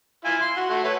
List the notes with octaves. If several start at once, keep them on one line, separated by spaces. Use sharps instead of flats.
E4 F4 G#5
C6
F#4
A3 F#4
A3 B4 C#5